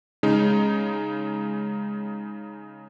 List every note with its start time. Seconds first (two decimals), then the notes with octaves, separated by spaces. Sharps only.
0.23 C#3 G#3 D#4